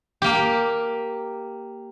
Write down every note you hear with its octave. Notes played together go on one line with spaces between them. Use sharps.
A#3 G4